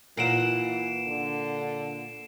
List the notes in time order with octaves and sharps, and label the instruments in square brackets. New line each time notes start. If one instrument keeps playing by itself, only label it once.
[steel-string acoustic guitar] A#2 F#5 [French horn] E3 [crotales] C7 D7 E7
[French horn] D3